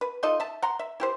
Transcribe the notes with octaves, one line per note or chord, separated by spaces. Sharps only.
B4
D#4 F4 A4 D#5
E5 A5
F#5 A#5 C6
E5
E4 G4 C5